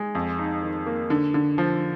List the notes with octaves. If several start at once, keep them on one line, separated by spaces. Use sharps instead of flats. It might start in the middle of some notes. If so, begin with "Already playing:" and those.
Already playing: G#3
F2
D#4
D#3
A#3
D3
D3
F3